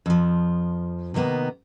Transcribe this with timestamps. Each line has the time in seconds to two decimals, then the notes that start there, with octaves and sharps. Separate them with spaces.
0.06 F2 F3
1.14 C3 D#3 A#3 B3 D#4